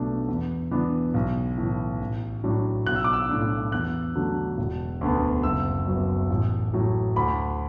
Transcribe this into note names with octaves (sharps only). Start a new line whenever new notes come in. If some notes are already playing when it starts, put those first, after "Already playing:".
Already playing: B1 B2 A3 D4
E2
E3 B3 D4
B1
A2 E3
A1
A2 F#3 D4
B1 F#6
E6
D6
E6
A2 A3 D4
E2 F#6
D3 F#3 A3 D4
E1
D2 D3 B3
F#1 E6
F#2 F#3 B3
A1
A2 F#3
D2 B5